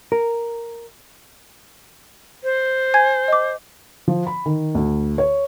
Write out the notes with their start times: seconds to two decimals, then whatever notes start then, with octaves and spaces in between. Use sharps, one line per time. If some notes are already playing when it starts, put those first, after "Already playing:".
0.12 A#4
2.44 C5
2.94 G#5 G#6
3.28 D#5 D6
4.08 F3
4.27 B5
4.46 D#3
4.75 D2
5.18 C#5